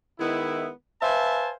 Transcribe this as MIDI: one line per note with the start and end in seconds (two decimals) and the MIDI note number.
0.19 0.69 51
0.19 0.69 56
0.19 0.69 59
0.19 0.69 64
1.02 1.51 71
1.02 1.51 72
1.02 1.51 76
1.02 1.51 77
1.02 1.51 80
1.02 1.51 81